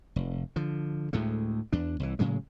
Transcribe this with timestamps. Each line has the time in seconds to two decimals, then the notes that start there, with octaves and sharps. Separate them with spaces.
0.16 F1
0.56 D3 F3
1.13 D2 A2 G#3 A3
1.73 E2 D4
2.00 C2 E3
2.19 A2 C#3 F#3 G#3